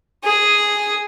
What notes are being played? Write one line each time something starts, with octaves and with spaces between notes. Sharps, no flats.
G#4